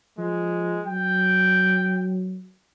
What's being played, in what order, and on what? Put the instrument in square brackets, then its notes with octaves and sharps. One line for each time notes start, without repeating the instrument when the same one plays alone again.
[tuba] F3 [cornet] G#3
[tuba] F#3 [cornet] G5